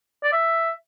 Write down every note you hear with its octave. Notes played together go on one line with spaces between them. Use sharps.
D5
E5